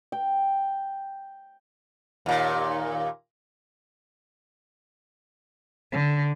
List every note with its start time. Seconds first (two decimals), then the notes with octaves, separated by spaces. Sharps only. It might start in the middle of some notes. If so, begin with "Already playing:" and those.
0.12 G5
2.26 D#2 A#2
5.92 D3